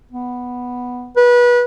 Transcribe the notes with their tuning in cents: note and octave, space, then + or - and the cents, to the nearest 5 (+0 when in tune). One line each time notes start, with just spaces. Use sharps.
B3 +0
B4 -25